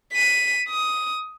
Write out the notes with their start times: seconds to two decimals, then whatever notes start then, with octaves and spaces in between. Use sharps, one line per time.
0.13 B6 D#7
0.69 D#6